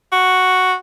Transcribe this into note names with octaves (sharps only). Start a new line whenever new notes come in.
F#4